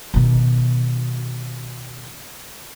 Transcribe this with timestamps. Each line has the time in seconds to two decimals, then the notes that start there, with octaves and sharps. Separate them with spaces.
0.14 B2 D#3